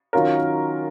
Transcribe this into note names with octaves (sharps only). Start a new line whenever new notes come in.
D#3 F#3 C#4 F4 A#4